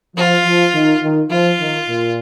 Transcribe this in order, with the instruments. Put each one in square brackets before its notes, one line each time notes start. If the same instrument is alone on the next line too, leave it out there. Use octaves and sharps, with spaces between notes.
[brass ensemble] F3 [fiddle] F4
[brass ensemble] F3
D#3
D#3
[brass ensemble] F3 [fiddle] F4
[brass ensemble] D#3
A#2